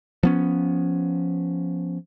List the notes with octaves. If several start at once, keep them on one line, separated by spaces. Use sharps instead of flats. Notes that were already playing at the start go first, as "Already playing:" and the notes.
F3 B3 C#4